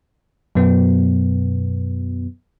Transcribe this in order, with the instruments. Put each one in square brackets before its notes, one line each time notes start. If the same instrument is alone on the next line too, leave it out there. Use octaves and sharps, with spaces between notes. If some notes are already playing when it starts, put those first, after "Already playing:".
[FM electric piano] F#2 B2 F#3 B3